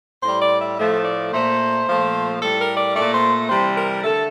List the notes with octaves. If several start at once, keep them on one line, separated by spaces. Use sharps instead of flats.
A2 G3 C5
D5
E5
A2 F3 A3 E5
D5
A#2 A3 C5
A#2 F3 A3
A2 G3 A4
A#4
D5
A#2 A3 D5
C5
C3 E3 G3 C5
A#4
D3 A3 A4